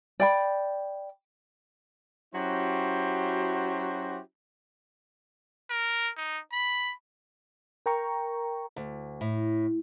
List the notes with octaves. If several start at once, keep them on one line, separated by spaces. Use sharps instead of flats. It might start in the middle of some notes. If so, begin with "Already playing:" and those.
D5 G5 B5
F#3 C#4 E4 F#4 G4 C5
A#4
D#4
B5
A#4 G5 A#5 C#6
D2
A2